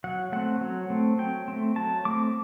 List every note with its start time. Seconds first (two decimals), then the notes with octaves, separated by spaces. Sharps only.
0.04 F#3 F#5
0.32 A3 C4 F#5
0.61 F#3
0.90 A3 C4
1.19 F#3 G5
1.48 A3 C4
1.76 F#3 A5
2.05 A3 C4 D6